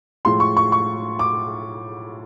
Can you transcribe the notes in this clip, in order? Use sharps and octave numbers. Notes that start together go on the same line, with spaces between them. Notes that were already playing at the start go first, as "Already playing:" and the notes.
A2 F3 G#3 C6
C#6
C#6
C#6
D6